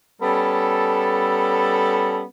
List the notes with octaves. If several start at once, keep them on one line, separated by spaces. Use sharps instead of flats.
G3 B3 C#4 A4